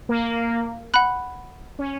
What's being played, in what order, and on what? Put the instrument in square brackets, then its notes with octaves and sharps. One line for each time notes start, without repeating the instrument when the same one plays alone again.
[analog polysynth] A#3
[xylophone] F#5 B5 F#6
[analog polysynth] C#4